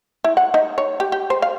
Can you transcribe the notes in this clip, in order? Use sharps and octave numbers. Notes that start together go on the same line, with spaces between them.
E4
F#5
D#4
C#5
G4
G4
C5
F5